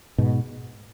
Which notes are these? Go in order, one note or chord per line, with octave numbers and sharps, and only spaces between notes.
G#2 B2